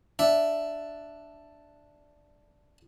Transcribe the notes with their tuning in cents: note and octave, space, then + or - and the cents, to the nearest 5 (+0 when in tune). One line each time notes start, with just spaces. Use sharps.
D4 +0 E5 +5